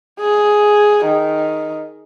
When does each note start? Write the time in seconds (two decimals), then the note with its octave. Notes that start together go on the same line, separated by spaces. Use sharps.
0.20 G#4
1.06 D#3